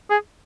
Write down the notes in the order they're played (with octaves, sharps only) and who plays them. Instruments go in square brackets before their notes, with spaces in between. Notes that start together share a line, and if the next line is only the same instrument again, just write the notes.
[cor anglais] G#4